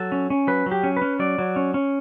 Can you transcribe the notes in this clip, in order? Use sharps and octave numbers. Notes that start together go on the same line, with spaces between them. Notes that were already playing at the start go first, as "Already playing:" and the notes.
Already playing: F#3 A4
C#4
C#4
F#3 B4
F#3
G4
C#4
B4
C#4
F#3 D5
F#3
C#4
C#4